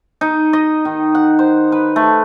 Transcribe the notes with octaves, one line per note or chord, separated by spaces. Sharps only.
D#4
D#5
D#3
F#5
C5
B4
A3